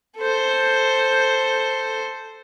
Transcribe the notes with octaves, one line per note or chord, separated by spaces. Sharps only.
A4 C5